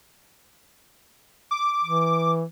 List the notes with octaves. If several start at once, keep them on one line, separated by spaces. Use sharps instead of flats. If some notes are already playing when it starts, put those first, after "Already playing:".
D6
E3